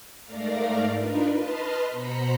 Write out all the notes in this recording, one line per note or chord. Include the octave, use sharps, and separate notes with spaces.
G#2 A3 A#4 D5 F5 A#5
D4 D#4 F4 A#4 B4
B4 D#5 A5 B5 C6 F6
B2 C5 A#5 B5 B6 C#7